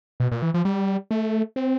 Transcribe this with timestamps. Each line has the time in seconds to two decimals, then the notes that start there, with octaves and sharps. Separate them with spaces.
0.20 B2
0.32 A#2
0.42 E3
0.54 F3
0.65 G3
1.11 A3
1.56 C4